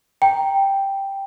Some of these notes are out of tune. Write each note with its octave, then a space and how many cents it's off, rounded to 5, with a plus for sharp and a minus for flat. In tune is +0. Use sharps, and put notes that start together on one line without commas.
G5 +0 A#5 +0